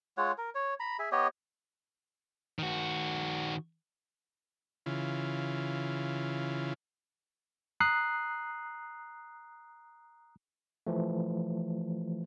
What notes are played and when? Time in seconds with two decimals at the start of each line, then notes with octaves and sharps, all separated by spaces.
0.17 G#3 F4 C#5 F#5
0.38 A#4
0.55 C#5
0.80 A#5 B5
0.99 G#4 E5
1.12 B3 G4 C#5 D#5
2.59 D#3 F#4
4.86 C#3 E3 F4
7.80 A#5 D#6 F#6 C7
10.87 E3 F3 A3